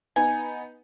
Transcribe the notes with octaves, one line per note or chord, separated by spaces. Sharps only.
B3 D#4 G#5